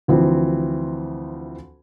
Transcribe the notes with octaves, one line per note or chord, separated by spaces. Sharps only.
D2 E3 F3 C4